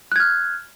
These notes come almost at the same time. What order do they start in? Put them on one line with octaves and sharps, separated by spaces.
F#6 G#6 F6